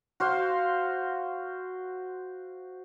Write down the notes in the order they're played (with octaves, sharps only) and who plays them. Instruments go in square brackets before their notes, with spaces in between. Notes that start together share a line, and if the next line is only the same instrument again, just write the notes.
[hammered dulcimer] F#4 C5 F5